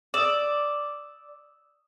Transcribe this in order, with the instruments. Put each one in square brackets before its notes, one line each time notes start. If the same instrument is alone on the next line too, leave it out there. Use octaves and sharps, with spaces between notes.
[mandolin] D5 [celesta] D#6 E6 E7